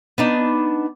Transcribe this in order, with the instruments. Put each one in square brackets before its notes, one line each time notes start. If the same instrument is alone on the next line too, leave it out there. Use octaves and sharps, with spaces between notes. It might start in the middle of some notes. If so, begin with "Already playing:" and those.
[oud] B3 D4 D#4